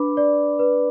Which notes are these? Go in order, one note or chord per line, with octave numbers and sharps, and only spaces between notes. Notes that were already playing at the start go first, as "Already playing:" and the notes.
Already playing: D4 B4 B5 D6
D5
B4